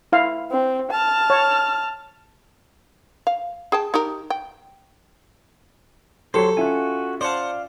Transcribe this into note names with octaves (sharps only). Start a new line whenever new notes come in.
E4 F5
C4
A5 F6
C#5
F5
G#4 G5 A5
D#4 G4 A#4
G5
F#3 G4 A4 C5 C#5 C6
C#4 F4 F#4 E5 G#5
C5 D5 F5 F#5 A5